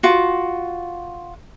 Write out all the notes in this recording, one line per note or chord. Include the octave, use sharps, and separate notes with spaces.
F4 F#4